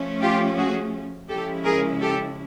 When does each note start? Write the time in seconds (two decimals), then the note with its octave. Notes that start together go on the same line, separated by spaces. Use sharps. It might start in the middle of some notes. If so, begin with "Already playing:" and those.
Already playing: F3 A3 C#4
0.22 F4 G4
0.58 F#4 G#4
1.29 C#3 F3 G#3 C#4 E4 G4 A4
1.65 G#4 A#4
2.01 G4 A4